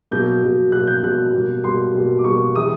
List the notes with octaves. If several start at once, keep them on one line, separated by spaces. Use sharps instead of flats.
B2 F#3 A#3 G6
B2 F#3 A#3
B2 F#3 A#3 F#6
G6
B2 F#3 A#3 F#6
B2 G3 A#3
B2 G3 A#3 C6
B2 G3 A#3
D6
B2 G3 A#3 C#6
C3 E3 G#3 D#6